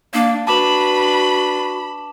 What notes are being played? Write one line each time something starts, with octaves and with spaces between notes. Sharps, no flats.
A#3 D4
D4 F#4 B4 A5 B5 D6 E7